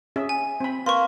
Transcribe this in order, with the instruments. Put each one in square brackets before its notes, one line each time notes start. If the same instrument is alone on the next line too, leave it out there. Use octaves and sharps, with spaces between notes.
[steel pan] C#4 G#4 E5
[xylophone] G#5
[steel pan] C4 B5
[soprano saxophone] A#3 [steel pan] B4 [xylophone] C6 C#6